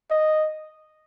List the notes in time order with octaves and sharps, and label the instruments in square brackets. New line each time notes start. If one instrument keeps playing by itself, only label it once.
[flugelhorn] D#5